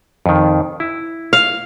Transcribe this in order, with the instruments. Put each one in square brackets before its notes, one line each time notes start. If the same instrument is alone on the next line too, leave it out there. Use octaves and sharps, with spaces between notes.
[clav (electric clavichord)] F2 D#3
E4
[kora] F5